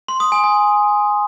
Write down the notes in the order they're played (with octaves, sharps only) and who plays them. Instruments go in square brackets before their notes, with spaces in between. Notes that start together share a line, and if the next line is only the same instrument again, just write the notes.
[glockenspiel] C6
D#6
G#5
G#5